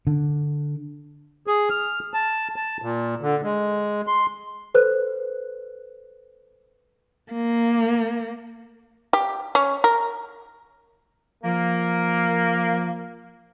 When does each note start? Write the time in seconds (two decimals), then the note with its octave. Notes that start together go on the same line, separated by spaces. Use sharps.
0.07 D3
1.47 G#4
1.70 F6
2.14 A5
2.56 A5
2.82 A#2
3.21 D3
3.44 G#3
4.07 C6
4.74 A4 B4 C5 F#6
7.30 A#3
9.13 G4
9.55 C#4
9.84 A#4
11.43 F3 A#3